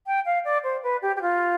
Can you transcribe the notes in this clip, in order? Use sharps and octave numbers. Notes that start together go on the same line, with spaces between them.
G5
F5
D5
C5
B4
G4
G4
F4